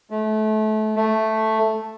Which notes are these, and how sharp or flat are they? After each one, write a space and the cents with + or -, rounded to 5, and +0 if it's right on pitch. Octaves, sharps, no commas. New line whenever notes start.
A3 -30
A3 +0